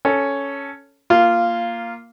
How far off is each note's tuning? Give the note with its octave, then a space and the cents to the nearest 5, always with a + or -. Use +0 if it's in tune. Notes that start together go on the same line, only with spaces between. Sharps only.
C#4 +5 A4 +0
A#3 +0 F4 -10